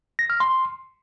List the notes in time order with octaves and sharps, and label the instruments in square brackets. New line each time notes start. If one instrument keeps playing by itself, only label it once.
[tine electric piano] A#6
F6
C6